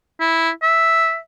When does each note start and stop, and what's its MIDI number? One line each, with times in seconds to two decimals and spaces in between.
0.20 0.50 64
0.62 1.18 76